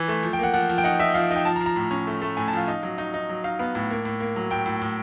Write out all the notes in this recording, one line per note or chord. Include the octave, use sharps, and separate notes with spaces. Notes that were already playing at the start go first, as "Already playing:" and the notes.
Already playing: E3
A3
F3
G5
A#3 F#5
F3 F#5
F3
G5
D#4 F#5
D#4 E5
F3 F5
D#4
G5
F3 A5
A#5
F3
A#5
A2
C#4
A3
A3
A2 G#5
A5
F3 F5
D#4
F#3
D#4
D#4
F#3
D#4 F5
B3 F5
A2
A#3
A2
A#3
F#3
A2 G5
A2
A2